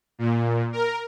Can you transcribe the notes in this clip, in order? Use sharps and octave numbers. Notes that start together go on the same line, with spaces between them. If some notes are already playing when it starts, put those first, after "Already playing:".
A#2
A#4